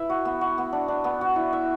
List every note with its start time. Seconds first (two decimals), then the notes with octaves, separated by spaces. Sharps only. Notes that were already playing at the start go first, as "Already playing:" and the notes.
Already playing: E4 B4 E5
0.10 F#4
0.25 B3
0.41 F#4
0.58 B3
0.73 D4
0.88 D4
1.04 B3
1.21 F#4
1.36 E4
1.53 E5